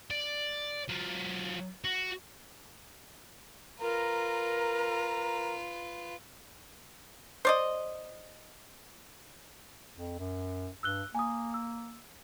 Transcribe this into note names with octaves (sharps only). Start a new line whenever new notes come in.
D5
F#3 F4
F#4
F4 A#4 B4 A#5
C5 D5 D#5
F2
F#2
G2 E6 F#6 G7
A#3 G#5 D#6
E6